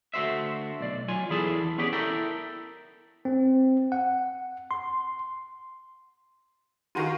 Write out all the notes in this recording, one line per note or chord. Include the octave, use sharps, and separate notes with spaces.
D2 A3 F#4 C5 E5
B1 D5
F#3 F4 G#5
E2 E3 E4 G#4 A4 A5
B3 C#4 G4 G#4 B4 D5
E4 A4 A#4 G5
C4
F#5
C6
D#3 F4 F#4 A#5 C6 D#7